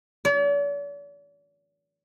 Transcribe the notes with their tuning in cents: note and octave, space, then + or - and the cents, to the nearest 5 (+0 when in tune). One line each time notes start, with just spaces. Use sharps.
D5 -45